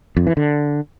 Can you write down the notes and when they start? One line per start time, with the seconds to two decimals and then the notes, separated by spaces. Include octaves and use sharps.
0.17 F2
0.27 E3
0.37 D3